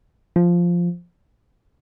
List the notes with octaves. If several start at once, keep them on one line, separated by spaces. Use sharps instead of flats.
F3